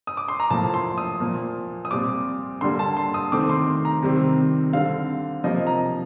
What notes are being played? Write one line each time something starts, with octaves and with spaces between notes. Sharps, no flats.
D#6
D6
C6
A#5
A2 F3 A#3 A5
C6
D#6
A#2 F3 A#3
D#6
A#2 G3 C4 D6
D3 G3 A#3 C6
A5
C6
D#6
D#3 A3 C4 D6
C6
A#5
C3 D#3 G3 C4
D3 G3 C4 F5
C3 F3 A#3 D#5
A#5